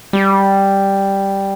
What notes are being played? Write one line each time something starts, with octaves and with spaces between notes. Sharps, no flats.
G3